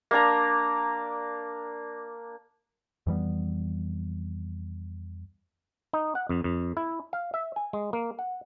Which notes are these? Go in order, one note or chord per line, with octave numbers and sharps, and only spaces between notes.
A#3 D4 A#5
F2 E3 G3 B3
D#4
F#5
F2
F2
E4
F5
E5
G#5
G#3
A#3
F#5